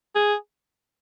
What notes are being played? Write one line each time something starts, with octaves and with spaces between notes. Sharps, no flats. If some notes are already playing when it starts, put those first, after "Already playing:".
G#4